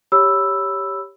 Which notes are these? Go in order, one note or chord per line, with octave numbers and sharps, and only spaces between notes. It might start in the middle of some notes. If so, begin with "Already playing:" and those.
G4 C#5 B5 E6